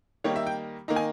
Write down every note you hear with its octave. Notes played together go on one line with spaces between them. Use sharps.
D#3 G3 A#3 D#4 C#5
E5
G5
D#3 A#3 D#4 A#5
G#5